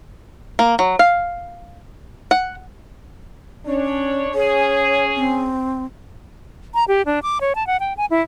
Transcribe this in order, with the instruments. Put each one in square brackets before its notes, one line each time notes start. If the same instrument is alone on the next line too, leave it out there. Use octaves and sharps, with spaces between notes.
[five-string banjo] A#3
F#3
F5
F#5
[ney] C#4 [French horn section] D4 C#5
[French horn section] C#4 G#4 [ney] C#5
[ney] C4
[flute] A#5
G4
D4
D6
C#5
A5
F#5
G5
G#5
E4